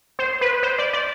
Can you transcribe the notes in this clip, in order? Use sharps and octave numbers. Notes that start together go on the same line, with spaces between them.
C5
B4
C5
D5
D5